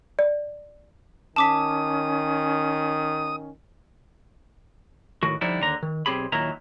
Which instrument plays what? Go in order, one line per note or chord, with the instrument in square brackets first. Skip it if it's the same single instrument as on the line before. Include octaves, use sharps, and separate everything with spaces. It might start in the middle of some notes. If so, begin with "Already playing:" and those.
[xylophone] D5
[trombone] D#3 [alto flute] C#4 [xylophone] A5 D6 B6 [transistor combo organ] D#6
[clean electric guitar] A2 D#3 F#4
D3 F3 G3 D#4 E4
D#2 D3 A#5
D#3
B1 C4 G4 G#4 B5
D#2 A#2 D#3 F#3 E4 A#5